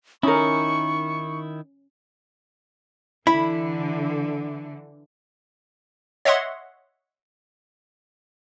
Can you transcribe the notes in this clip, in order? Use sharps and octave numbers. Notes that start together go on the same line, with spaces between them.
D#3 C#4 D#4 E4 A#4 C#6
D3 E3 E4 B5
C#5 D#5 E5 F#5 C6